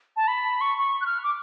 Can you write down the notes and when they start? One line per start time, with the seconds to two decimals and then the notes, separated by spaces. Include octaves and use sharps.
0.16 A5
0.28 B5
0.61 C#6
0.78 C#6
1.01 F#6
1.06 F6
1.23 D6